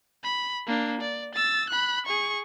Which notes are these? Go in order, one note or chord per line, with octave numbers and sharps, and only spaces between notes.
B5
A#3 D4
D5
E6 A6
B5 F#6
G#4 C#6